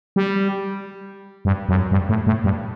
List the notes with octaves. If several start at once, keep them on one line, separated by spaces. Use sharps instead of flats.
G3
G2
F#2
G2
A2
A2
G2